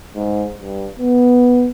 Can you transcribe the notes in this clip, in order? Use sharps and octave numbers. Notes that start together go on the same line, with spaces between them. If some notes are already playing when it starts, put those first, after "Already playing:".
G#2
G2
B3